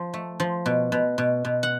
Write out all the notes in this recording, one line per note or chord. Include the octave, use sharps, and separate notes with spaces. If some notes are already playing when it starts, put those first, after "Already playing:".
Already playing: F3
A3
F3
B2
B2
B2
B2
F#5